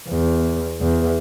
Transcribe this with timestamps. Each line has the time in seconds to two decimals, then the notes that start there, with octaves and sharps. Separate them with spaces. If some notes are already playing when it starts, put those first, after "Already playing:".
0.09 E2
0.81 E2